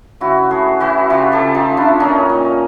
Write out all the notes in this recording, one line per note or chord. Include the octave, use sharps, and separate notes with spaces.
C#3 E4 F#4
A3 F#4 G#4
E3 E4 F#4
C#3 F4 G4
G4 A4
C#3
D#4 F4
A3
D4 E4
A#2 C#4 D#4
A#2